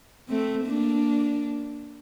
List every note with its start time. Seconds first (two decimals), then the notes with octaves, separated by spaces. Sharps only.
0.29 A3 C4
0.66 A#3 D4